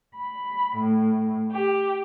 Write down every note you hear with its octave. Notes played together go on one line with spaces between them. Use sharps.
B5
A2
G4